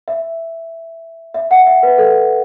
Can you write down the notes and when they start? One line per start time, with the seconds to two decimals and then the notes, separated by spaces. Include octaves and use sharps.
0.08 E5
1.35 E5
1.51 F#5
1.67 E5
1.83 B4
1.98 A4